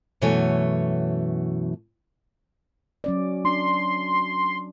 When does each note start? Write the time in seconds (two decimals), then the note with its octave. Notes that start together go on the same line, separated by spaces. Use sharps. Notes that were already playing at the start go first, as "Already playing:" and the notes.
0.21 F#2 B2 E3 A3 C#5 G#5
3.04 F#3 C#4 D5
3.45 D4 C6